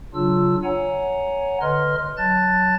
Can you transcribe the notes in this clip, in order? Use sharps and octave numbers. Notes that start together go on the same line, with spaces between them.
C#3 F#3 D4 F4 E6
C#5 F#5 G#5 A#5
D3 B4 D#5 C6 F6
F#3 A5 F#6 A6